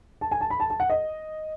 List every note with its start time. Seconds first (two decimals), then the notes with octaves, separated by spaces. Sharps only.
0.21 A5
0.31 G#5
0.41 A5
0.50 B5
0.60 A5
0.70 A5
0.80 F#5
0.90 D#5